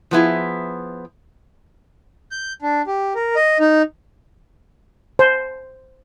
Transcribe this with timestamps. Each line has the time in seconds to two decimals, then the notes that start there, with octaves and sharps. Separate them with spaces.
0.11 F3 B3 E4 G#4
2.31 G6
2.62 D4
2.87 G4
3.15 A#4
3.36 D#5
3.60 D#4
5.19 C5